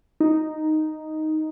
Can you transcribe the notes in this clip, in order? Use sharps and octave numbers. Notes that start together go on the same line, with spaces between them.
D#4